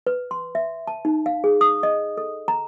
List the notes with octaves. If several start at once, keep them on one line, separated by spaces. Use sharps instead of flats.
B4
C6
E5
A5
D#4
F5
G#4
D#6
D#5
A4
A#5